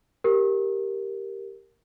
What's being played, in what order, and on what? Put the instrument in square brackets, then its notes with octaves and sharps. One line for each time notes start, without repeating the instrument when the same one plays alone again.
[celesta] G4 A#4